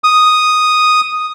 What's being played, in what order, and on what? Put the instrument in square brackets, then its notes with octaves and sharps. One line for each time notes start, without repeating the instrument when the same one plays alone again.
[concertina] D#6